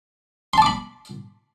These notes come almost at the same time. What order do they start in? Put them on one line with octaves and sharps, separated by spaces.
C6 A5 D6 B5